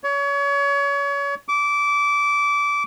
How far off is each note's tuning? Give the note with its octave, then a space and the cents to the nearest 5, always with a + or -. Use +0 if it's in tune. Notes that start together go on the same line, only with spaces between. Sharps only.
C#5 +30
D6 -20